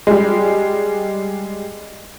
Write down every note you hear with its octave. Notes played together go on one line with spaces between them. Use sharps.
G3 G#3